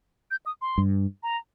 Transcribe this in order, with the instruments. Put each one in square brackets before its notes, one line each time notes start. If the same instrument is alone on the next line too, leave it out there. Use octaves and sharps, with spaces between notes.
[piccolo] G6
D#6
C6
[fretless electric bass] G2
[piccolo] A#5